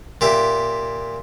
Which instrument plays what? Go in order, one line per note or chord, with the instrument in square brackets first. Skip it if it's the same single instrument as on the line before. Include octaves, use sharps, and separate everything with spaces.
[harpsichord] A#2 G4 E5